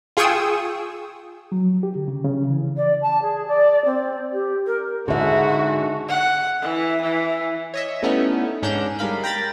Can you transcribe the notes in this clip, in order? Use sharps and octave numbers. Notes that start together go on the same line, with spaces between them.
F4 G#4 G5 C#6 D#6 E6
F#3
G4
D3
C#3
C#3
E3
D5
A5
G#4
D5
C4
G4
A#4
G#2 D3 F#4 G#4 E5
F#5
E3
E3
C#5 D#5 E5
G3 A3 B3 C#4 D#4 E4
G#2 C#4 D4 A#5 G6 E7
G3 G#3 A#4 F5 B5
G5 A#5 B5 A6